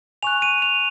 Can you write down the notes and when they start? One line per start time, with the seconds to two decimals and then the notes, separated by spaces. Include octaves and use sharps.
0.23 G#5 C#6 F#6 F7
0.42 D#7
0.62 F7